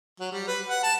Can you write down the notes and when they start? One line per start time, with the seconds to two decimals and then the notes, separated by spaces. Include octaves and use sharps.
0.20 F#3
0.32 G3
0.47 B4
0.69 F#5
0.83 A5